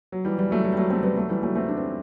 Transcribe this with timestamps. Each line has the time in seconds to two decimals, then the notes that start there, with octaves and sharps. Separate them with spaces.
0.12 F#3
0.25 E3 G3
0.38 E3 G3
0.51 F#3 A3
0.64 F#3
0.73 G3
0.78 F#3 A3
0.90 A3 C4
1.03 G3 B3
1.16 F#3 A3
1.29 E3 G3
1.43 F#3 A3
1.55 A3 C4
1.69 D4
1.78 C4